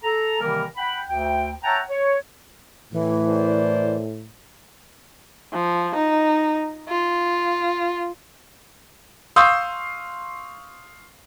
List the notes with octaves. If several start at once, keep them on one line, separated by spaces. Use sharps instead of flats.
A4 A#5
C3 D#3 E3 G3 A#3 A#4
F#5 G5 B5
D2 G5
C#5 E5 F#5 G5 A5 A#5
C#5
A2 E3
A#4 C5 D5
F3
D#4
F4
F5 C6 C#6 D#6 E6 G6